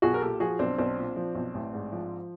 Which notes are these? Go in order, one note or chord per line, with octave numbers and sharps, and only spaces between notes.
B1 F#4 G#4
A#4
A#2 G4 A4
F3 F#4 G#4
B1 C4 D4
B1 C4 D4
A#2
F3
B1
A1
G#2
F3